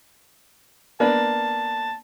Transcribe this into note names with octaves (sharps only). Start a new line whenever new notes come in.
A#3 B3 D4 A5